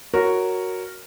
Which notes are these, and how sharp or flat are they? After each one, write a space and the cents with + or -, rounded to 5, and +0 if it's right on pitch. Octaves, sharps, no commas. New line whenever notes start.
F#4 +0 A#4 -5 C#5 +0